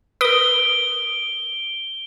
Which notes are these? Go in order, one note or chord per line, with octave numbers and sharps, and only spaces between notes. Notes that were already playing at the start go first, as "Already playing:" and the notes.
A#4 B4 D#6 D7 G7